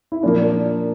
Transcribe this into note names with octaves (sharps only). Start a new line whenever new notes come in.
E4
A#2 F3 A#3 D4